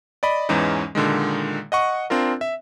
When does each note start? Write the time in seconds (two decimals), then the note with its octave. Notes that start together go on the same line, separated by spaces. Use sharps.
0.23 D5 D#5 B5
0.49 E2 G#2 E3 G#3 C#4 D#4
0.95 A#2 D3 D#3 G#3
1.72 D#5 F#5 C#6
2.10 C4 D4 F4 A#4
2.41 E5